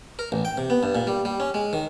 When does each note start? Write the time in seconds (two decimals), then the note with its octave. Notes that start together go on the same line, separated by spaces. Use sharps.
0.19 A#4
0.32 A1
0.45 G5
0.58 C3
0.70 B3
0.83 G2
0.95 A#2
1.07 G3
1.25 G3
1.40 C#4
1.54 G#3
1.73 D#3